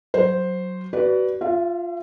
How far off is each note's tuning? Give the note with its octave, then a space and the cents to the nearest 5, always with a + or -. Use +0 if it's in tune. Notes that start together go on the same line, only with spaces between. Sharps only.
F#3 +0 C5 +0
F#4 +35 B4 +0 D5 +0
F4 +0 E5 +45